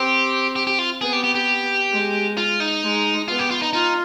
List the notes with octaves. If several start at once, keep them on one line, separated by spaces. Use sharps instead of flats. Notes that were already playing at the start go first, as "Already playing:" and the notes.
Already playing: C4 G4
G4
G4
F4
B3 G#4
G4
G4
G4
G#3
F4
D#4
G#3
B3 F4
G4
F4
D#4
D#4 F4